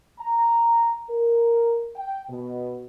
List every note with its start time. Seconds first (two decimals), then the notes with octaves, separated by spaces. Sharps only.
0.19 A#5
1.10 A#4
1.96 G5
2.30 B2